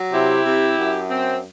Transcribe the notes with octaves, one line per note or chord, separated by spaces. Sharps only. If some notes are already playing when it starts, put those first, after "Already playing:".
Already playing: F#3
C3 E4 G4
C3
F#2
C4